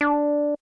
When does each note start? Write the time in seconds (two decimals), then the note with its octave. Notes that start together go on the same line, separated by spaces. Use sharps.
0.01 D4